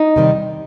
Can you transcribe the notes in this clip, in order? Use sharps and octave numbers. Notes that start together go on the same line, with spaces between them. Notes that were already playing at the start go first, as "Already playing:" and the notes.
Already playing: D#4
C3 D#3 G3